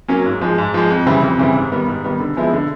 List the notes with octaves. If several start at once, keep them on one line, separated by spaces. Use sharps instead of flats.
F#3 A#3 C#4
G#2
F3 G#3
G#2
F3 G#3
F2
C#3 E3 G3 C4
F2
C#3 E3 G3 C4
G#2
D#3 G3 B3
G#2
D#3 G3 B3
D3
F3 G#3 B3 E4
D3